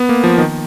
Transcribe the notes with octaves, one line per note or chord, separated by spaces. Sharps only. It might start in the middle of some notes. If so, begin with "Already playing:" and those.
Already playing: B3
A#3
F3
D#3